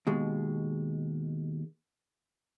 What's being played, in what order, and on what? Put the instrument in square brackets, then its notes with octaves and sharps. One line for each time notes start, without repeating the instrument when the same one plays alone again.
[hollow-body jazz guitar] D#2 B2 G#3